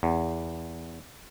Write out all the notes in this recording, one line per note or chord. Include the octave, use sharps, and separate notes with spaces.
E2